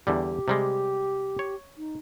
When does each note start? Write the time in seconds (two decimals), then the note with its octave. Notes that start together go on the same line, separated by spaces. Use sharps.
0.07 E2 D3 G3 G4
0.48 C3 G3 G#3
1.39 C#5
1.77 D#4